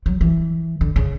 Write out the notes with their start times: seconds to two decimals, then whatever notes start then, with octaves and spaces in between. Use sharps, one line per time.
0.06 F#3
0.21 E3
0.81 D3
0.96 C#3